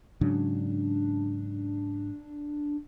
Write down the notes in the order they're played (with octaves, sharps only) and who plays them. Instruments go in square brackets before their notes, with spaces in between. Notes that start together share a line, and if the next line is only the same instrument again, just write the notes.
[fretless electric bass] G#2 C#3 F#3 [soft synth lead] D4